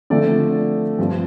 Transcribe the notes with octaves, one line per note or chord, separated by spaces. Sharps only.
D3 F3 A3 C4 D5
G2 F3 C4